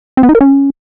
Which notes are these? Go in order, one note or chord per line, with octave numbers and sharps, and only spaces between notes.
C4
B3
D#4
A#4
C#4